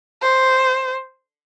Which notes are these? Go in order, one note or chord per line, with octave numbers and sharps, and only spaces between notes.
C5